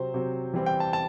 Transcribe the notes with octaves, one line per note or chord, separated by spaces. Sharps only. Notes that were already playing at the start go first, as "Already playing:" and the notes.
Already playing: C3 F#3 C4 C5
C3 F#3 C4
E3 G3 C4
G5
A5
A5